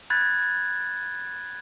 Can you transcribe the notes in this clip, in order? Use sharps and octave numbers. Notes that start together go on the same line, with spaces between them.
B5 F#6 G#6 A6